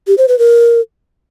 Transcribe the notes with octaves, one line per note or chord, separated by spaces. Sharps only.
G4
C5
B4
A#4